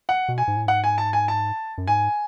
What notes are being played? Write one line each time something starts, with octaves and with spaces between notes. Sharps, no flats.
F#5
B2
G#5
G#2
A2
G#2 F#5
G#5
A5
G#5
A5
F#2
G#2 G#5